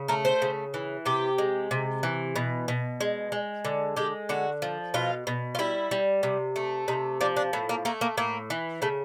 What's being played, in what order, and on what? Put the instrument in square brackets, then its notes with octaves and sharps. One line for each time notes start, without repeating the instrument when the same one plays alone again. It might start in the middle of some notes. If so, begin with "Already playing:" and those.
Already playing: [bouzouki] C#3
A3 A#4
C5
C#3
E3
C3 G4
G#3
C3
E3
B2
B2
G#3
G#3
D3
G#3 G4
D3 F#4
F3
B2 F4
B2
F4
G3 E4
G3
C3
A3
C3 D#4
F3 D4
D4
A2 B3
A#3
A3 A#3
A#3
A2 A#3
E3
C#3 A3